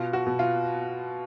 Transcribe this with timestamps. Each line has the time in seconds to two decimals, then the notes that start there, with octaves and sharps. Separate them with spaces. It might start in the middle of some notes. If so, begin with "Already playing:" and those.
Already playing: B2 F4
0.13 F#4
0.26 B2
0.39 F4